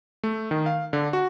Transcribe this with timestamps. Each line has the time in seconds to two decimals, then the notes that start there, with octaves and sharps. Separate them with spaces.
0.24 A3
0.51 D#3
0.66 F5
0.93 D3
1.13 F#4